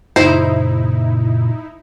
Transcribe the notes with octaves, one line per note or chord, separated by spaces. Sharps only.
F#2 A#2 C#3 D#4 E4 C5